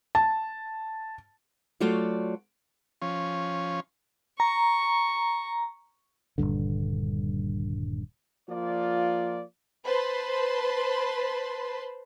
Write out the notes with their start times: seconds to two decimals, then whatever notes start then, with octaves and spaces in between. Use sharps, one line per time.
0.15 A5
1.80 F#3 A3 F4 F#4 C#5 D5
3.02 F3 C#4
4.40 A#5 C#6
6.38 D#1 A#1 G2 D3
8.50 F3 A#3 F4 D5
9.85 B4 C5 A5 B5 C6